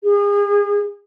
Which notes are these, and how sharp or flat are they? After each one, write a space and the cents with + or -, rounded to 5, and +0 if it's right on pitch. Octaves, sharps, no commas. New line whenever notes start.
G#4 -35